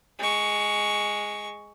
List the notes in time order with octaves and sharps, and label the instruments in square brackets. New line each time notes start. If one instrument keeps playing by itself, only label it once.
[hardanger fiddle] G#3 C#6